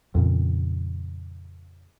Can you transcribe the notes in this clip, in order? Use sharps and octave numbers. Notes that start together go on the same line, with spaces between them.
F2 A#2 C#3